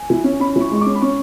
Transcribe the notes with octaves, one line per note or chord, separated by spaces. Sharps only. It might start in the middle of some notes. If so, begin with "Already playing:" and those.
Already playing: G#5
E3
C#4
C#4 B5
E3 C#6
G#3 C#6
C#4 D6
B5
C#4 C#6